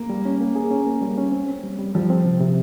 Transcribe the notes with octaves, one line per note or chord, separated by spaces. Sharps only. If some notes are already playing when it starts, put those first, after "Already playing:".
Already playing: A#3
G3
C#4
A#3
G#4
C#4
A#3
G3
C#4
C4
C4
G3
G3
F3 G3
C4
C3
C3